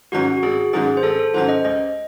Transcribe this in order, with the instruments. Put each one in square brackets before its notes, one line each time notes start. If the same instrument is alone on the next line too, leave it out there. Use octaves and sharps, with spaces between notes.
[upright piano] G#2 D#3 F#3 C#4 [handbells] F#4
[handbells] F#4
[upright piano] G#1 [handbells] G#4
[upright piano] G#2 D#3 F#3 C#4 [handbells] G#4
[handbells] C5
[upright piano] G#1 [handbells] A4
[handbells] A4
[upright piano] G#2 D#3 F#3 C#4 [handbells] C5
[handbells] D#5
[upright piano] C#2 [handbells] D#5